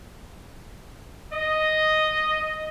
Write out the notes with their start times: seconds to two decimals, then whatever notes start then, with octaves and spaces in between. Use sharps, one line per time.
1.33 D#5